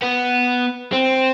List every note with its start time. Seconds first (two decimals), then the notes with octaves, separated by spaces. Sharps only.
0.02 B3
0.92 C4